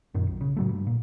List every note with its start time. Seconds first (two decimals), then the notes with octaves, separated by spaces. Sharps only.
0.14 F#2 A#2 D#3
0.27 B1
0.41 C#3
0.57 A2 F#3 A3
0.69 G2
0.87 A#2